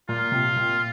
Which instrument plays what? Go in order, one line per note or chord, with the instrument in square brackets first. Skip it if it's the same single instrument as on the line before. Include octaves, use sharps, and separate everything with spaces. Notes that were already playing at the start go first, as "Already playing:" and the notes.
[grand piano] A#2 [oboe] F4
[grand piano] C3
A#2